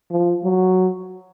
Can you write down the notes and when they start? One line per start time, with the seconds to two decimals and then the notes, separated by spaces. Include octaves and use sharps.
0.11 F3
0.44 F#3